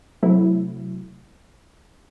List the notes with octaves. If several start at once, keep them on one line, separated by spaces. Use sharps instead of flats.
C3 F#3 A3 E4